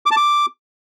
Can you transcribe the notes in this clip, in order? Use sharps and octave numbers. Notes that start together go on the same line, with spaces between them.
D6
A5
D6